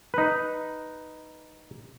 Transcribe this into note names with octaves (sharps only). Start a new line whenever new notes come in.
D#4 B4